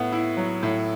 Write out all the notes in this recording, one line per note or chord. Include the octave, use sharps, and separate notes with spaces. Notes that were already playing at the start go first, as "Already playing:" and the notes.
Already playing: A2 B3
E4
F#3
A2